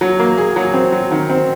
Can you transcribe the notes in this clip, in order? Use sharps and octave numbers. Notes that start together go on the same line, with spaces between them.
F#3
A#3
G#4
F#3
C4
F#3
D#3
C4